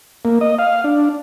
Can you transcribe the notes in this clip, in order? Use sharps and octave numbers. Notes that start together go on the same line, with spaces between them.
A#3
D#5
F5
D4